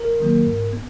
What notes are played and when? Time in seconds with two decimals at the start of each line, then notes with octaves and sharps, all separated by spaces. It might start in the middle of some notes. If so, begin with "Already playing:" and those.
Already playing: A#4
0.20 D#3 F#3 A#3
0.46 G#2
0.73 B3